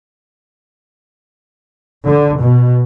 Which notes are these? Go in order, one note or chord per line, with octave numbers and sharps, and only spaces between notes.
D3
B2